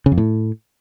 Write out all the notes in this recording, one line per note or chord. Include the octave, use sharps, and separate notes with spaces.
C#3
F2
A2